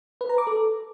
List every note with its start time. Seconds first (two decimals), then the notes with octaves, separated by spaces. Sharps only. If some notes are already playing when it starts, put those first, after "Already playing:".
0.21 B4
0.29 A#5
0.38 D6
0.47 A4